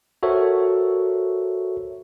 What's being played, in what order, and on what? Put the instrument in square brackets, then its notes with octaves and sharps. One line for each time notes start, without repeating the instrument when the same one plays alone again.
[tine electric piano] F#4 A4 A#4 C5 C#5 E5